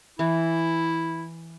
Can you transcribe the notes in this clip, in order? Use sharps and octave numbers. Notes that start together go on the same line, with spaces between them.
E3 E4